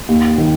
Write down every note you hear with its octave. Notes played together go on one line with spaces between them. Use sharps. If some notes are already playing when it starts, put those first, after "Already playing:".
D#2
D#3